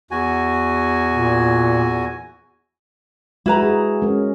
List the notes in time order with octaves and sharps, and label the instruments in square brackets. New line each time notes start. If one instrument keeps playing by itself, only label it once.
[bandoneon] E2 F#4 G#5
[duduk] A#2
[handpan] G#3 F#4 [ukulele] E4 B4 A#5
[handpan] G#4
G#3 C#4 A#4